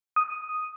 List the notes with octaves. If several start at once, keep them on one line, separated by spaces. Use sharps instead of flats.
D#6